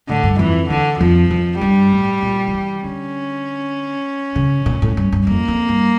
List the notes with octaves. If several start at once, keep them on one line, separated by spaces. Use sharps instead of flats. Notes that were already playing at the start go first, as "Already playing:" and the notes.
A2 D3
G2
F2 E3
E2 D3
F2 F3
F2
G2 G3
A2
A#2
D3
E3
D3 C#4
C#3
A#2
A2
G2
G2
F2 A#3
F2
G2